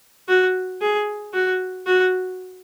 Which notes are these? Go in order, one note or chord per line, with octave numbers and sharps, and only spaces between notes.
F#4
G#4
F#4
F#4